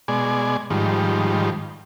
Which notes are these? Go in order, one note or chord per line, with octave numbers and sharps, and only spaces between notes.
B2 G#3 D5 G#5
G#2 D#3 F3 G3